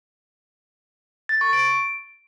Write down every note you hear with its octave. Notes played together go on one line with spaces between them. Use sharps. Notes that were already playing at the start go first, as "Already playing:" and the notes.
A6
C#6
D7